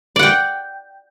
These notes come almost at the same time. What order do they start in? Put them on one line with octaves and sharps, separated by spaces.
D5 F#5 G5